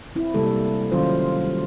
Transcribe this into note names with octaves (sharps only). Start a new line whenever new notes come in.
C4 E4
C3 G3 G#3 A#3 A4
D#3 F#3 C#4 F4 C5
G3